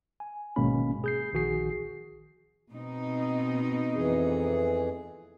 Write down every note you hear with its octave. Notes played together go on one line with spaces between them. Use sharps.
G#5
G#1 B2 G#3 A#3 C#4 B5
G#4 G6 C7
A#1 D#3 F#4 G#4 C7
B2 C4 D#4
F2 E3 G#4